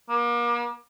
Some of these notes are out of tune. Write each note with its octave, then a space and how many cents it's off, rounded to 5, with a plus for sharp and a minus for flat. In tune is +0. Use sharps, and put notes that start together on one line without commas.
A#3 +40